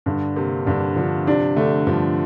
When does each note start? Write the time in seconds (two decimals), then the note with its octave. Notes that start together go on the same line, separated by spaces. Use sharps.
0.06 G2 D3
0.36 C3 A#3
0.66 G2 D3
0.96 D3 F3
1.27 C3 D4
1.56 D3 A3
1.87 G2 F3